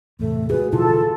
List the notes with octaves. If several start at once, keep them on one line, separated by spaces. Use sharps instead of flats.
E2 A2 C3 A3
F#4 G#4 B4
B2 D3 F3 E4 F4 A4 A5